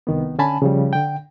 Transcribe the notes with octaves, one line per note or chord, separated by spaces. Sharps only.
C2 D#3 B3
D3 C#4 G#5 A5 B5
C#3 F3 G3
D3 G5